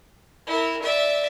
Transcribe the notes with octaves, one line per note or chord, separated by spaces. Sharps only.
E4 A#4
D5 E5